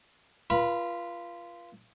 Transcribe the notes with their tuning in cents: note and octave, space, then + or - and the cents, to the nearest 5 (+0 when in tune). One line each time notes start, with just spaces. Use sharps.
F4 -20 B4 -40 B5 +0